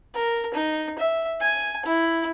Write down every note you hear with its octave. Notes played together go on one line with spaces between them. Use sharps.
A#4
D#4
E5
G#5
E4